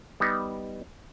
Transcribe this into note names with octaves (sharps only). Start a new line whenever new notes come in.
G3 B3 D#4